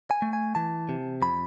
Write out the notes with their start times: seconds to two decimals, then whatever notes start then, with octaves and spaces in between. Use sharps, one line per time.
0.11 G#5
0.22 A3
0.33 G#5
0.55 E3 A5
0.89 C3
1.22 F2 B5